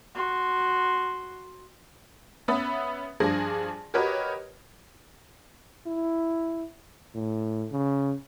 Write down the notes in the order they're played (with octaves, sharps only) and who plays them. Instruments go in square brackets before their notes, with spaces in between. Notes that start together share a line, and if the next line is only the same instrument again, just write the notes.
[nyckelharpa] F#4 C6
[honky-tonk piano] B3 C#4 E5 B5 D#6 A6
G2 F3 D4 G#4 A#6
F#4 G4 A#4 B4 C#5 D#5
[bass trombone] E4
A2
C#3